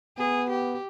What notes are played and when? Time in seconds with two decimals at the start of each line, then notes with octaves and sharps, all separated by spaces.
0.18 B3 G#4
0.50 G4